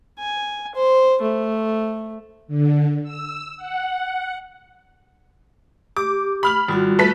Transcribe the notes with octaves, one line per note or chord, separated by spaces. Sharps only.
G#5
C5
A3
D3
E6
F#5
G4 D6
B5 F6 F#7
G#1 G3 F4 F#4
A3 B4 B6